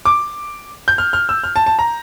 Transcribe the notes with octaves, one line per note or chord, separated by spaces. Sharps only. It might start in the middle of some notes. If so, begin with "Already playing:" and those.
D6
G6
F6
F6
E6
F6
A5
A5
A#5